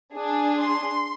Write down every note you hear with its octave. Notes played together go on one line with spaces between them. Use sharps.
D4 G#4
C6